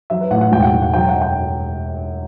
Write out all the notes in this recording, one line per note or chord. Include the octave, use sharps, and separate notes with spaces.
F#3 E5
B4
A1 F#5
F#5
E1 G5
F#5
E1
F#5
F#3 G5
F#5
F#2
G5